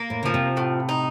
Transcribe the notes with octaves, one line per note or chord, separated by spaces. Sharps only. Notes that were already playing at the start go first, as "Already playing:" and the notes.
Already playing: A#3
A2
C#3 F3
C3
A2
D#4